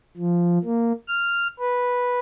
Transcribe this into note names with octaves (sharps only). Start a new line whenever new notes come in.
F3
A#3
F6
B4